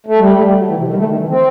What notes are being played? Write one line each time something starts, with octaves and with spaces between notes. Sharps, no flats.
A3
G3
A3
G3
F#3
E3
C3
D#3
G3
A3
D#3
E3
C4